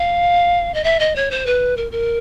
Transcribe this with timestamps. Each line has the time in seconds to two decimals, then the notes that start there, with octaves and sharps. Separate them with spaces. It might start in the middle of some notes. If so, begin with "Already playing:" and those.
Already playing: F5
0.74 D#5
0.84 E5
0.99 D#5
1.15 C#5
1.31 C5
1.46 B4
1.77 A#4
1.92 A#4